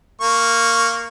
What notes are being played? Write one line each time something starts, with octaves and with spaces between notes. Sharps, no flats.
A#3 C#6